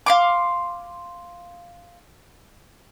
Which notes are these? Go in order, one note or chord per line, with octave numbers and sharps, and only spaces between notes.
F5 C6 D6